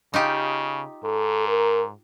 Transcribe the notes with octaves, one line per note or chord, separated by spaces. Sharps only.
C#3 D#4 F4 G4
G#2 A4
A#4